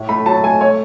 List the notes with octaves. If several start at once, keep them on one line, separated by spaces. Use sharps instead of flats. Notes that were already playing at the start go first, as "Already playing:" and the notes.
Already playing: A2
A3 B5
F#3 A5
A3 G#5
A3 C#5